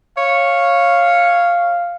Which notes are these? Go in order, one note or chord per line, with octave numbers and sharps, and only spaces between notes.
C#5 F5